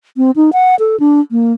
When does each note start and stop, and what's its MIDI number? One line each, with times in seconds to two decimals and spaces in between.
0.17 0.31 60
0.36 0.51 63
0.53 0.75 78
0.79 0.99 69
1.00 1.20 62
1.31 1.52 58